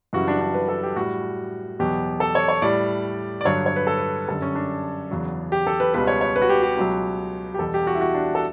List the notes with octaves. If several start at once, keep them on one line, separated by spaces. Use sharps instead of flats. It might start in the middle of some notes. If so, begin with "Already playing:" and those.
F#2 C#3 E3 G3 F#4
D4
D4
B4
A4
G4
A2 G3 F#4
E2 B2 F#3 G4
A4
C#5
C#5
A2 G3 D5
D5
G2 D3 F#3 C#5
C#5
B4
A4
B4
F#2 D3 G3 A4
C#4
D4
E2 C#3 F#3
G4
A4
B4
C#2 B2 G3 B4
C#5
C#5
B4
F#4
G4
G4
C#2 B2 F#3
G4
E2 B2 G3 A4
G4
F#4
E4
F#4
D4
A4